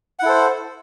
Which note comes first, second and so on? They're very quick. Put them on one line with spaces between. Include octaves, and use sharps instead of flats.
F#5 E4 A4 C5